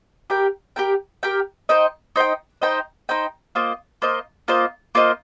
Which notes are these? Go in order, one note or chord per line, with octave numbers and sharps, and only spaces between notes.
G4 A#4 G5
G4 A#4 G5
G4 A#4 G5
D#4 C5 D#5 G5
D#4 C5 D#5 G5
D#4 C5 D#5 G5
D#4 C5 D#5 G5
A#3 F4 C5 D#5
A#3 F4 C5 D#5
A#3 F4 C5 D#5
A#3 F4 C5 D#5